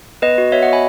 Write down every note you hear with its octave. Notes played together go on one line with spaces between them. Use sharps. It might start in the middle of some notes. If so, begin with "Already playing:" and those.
B3 B4 D#5
F#4
B3 C#5 E5
F#4 D#5 F#5
G#5 B5